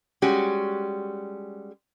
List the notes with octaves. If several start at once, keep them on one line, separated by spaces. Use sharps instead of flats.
G3 G#3 C#4 F#4 G4